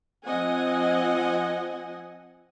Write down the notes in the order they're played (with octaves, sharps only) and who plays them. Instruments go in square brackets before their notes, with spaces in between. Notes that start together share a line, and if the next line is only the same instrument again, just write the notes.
[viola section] F3 C4 D#5 F#5 G#5